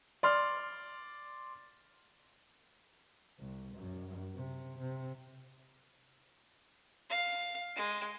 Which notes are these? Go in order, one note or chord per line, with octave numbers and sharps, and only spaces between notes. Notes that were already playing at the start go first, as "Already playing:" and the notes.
D5 C6 F6
C2
F#2
C3
C3
F5
G#3